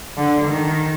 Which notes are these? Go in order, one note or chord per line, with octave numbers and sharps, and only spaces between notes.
D3
D#3